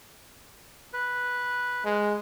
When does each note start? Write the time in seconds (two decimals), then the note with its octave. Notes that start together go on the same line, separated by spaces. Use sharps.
0.93 B4
1.85 G#3